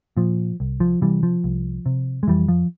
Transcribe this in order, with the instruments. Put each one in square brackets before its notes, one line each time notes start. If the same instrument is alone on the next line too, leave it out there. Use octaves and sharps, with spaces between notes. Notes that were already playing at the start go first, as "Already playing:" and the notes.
[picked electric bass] A#2 F3
C2
F3
C3 E3 G3
F3
C2
C3
G#3
F2 E3 G3
F3